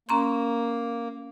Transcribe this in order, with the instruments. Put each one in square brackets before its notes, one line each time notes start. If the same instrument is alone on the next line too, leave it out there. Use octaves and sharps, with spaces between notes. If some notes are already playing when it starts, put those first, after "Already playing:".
[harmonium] A#3 [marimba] C#4 A#5 C6